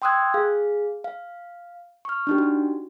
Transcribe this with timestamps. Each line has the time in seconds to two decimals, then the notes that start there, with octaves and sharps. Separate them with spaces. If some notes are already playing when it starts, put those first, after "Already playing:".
0.02 G5 C6 D#6 E6 F#6 G#6
0.34 G#4 F5
1.04 F5
2.05 C#6 F6
2.27 D4 D#4 G4
2.38 F#4